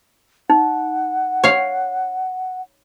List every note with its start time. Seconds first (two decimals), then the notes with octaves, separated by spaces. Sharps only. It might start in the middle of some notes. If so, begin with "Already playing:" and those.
0.50 D#4 F#5
1.44 C#5 F5